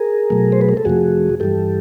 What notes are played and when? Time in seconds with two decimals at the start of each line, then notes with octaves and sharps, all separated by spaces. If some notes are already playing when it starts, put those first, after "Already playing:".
Already playing: G#4 A#4
0.30 B2 F#3 A3
0.52 C5
0.61 B4
0.69 A#4
0.77 A4
0.85 F2 C3 F3 A3 F#4 G#4
1.40 G2 E3 G3 G4 A4